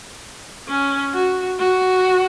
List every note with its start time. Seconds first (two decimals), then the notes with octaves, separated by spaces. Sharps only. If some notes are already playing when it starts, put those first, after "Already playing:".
0.69 C#4
1.14 F#4
1.60 F#4